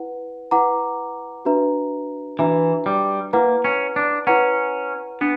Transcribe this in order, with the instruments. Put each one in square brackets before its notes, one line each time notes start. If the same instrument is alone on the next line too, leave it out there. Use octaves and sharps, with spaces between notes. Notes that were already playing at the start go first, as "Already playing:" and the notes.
Already playing: [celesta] E4 B4 F#5
E4 B4 F#5 A#5 D6
D4 F#4 B4 E5 A#5
[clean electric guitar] E3 [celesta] D4 F#4 B4 E5 A#5
[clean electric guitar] G3
[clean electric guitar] A#3 [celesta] E4 B4 F#5 A#5
[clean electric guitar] C#4
D4
[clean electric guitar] C#4 [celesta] E4 B4 F#5 A#5
[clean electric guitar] B3 [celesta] D4